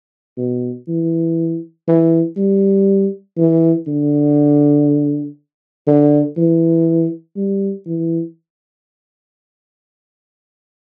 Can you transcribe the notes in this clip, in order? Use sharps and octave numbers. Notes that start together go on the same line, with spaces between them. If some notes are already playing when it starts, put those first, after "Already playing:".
B2
E3
E3
G3
E3
D3
D3
E3
G3
E3